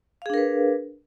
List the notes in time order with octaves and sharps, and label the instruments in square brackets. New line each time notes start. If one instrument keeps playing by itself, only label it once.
[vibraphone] F5
G#4
D4
A#4
B4